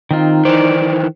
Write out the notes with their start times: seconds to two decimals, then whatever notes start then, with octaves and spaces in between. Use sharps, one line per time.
0.11 D#3 C4 D#4 F4
0.45 D#3 E3 C5 D5